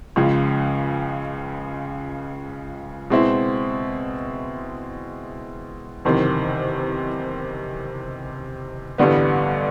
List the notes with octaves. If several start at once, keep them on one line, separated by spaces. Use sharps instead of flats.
C#2 C#3 F3 G#3
B2 G#3 C4 E4
F#1 E2 C3 D#3
A1 G2 D3 G3 B3